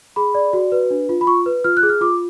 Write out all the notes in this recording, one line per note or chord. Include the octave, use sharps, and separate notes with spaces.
G#4 B5
D5
F#4
B4
D4
F4
B5
F4 C#6
B4
F4 F6
F#6
G#4
F6
F4 D6